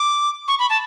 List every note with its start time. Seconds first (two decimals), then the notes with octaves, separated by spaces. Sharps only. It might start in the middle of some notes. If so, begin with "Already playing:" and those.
Already playing: D6
0.48 C#6
0.59 B5
0.70 A5